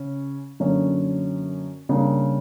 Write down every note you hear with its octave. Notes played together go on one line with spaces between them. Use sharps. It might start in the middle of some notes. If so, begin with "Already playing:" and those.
Already playing: C#3 C#4
F#2 D3 A#3 C#4
C#3 G3 A#3 D4